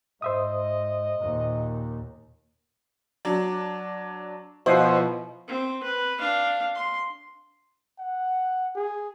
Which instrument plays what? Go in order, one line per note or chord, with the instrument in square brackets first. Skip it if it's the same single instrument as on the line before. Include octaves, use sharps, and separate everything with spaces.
[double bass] G#2 [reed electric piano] C5 E5 D#6 [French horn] D#5
[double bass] D#2 A#2
[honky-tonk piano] F#3 D4
[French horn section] B2 F3 [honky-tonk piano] E4 [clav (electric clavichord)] C5 D#5 F#5
[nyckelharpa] C4
B4
D4 F5
C6
[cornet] F#5
G#4